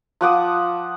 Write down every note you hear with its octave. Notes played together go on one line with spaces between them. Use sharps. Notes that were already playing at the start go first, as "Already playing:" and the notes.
F3 F#5 D6 D#6